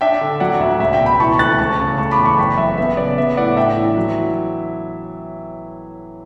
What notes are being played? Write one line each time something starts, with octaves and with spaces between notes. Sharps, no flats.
D4 E5 G5
D3
F#3 D5 F#5
D2 E5
C#2 E5
E5 G5
B2
G5 B5
E3 A5 C#6
D2 F#6 A6
C#2 A5 C#6
C#3
A3 A5 C#6
B5 D6
E2
A5 C#6
F#1 G5 B5
F#2 E5
B3 E5
C#3 D5
B3 E5
A2 D5 F#5
D4 E5 G5
E3
F#3